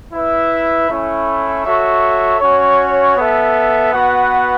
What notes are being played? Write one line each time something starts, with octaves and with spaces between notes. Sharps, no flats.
E4 B4 E5
A3 C#4 E4
F#4 A4 C#5 E5
C#4 F#4 C#5
B3 A4 E5
B3 F#4 B4 F#5